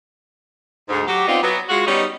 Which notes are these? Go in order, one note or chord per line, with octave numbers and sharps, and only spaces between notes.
D2 G#2
F#3 F#4 G4
B3 C4 D4 D#4 F4
F#3 B3
G#3 F4 F#4
G3 B3 C#4 D#4